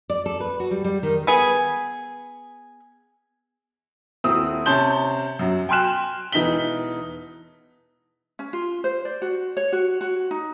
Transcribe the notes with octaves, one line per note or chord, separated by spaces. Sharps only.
D5
A4
B4
F#4
G3
G3
D#3
B3 G#4
D#1 C4 E4 D#6 E6
C3 C#4 A5 C6 G6 G7
F#2 F#3
G5 G#5 C6 F6 F#6 E7
E1 E3 D#4 B6 G7
C#4
F4
C5
D5
F#4
C#5
F#4
F#4
D#4